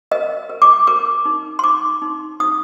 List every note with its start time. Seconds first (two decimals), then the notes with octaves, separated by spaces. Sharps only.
0.11 A#4 D#5
0.50 A#4
0.62 D6
0.87 A#4 D6
1.25 D#4
1.59 C6
1.64 D#4 D6
2.02 D#4
2.40 D#4 D#6